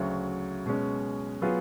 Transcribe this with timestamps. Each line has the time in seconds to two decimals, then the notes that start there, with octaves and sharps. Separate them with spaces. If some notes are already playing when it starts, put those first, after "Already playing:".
Already playing: D2 C#3 F#3
0.65 B2 G#3 C#4
1.42 F#3 B3 F4 G#4